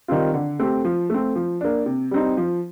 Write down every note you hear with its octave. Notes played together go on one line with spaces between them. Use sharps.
D#3 G3 C4 F4
D3
A3 C4 G4
F3
A3 C4
F3
A#3 D4
C3
G3 C4 D#4
F3